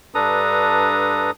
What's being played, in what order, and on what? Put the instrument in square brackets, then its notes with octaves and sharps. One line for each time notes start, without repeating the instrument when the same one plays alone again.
[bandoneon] G2 D4 A4 B4 A#5 D#6